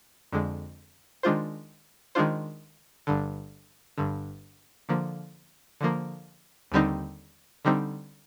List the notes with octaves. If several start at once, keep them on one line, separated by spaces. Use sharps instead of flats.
F2 D3 G#3
D#3 G#3 D4 F4 C5
D#3 G#3 D4 F4 C5
G1 G2 D3
G1 G2 D3
D3 F3 A#3
D3 F3 A#3
D#2 D3 G3 C4 D#4
D3 G3 C4 D#4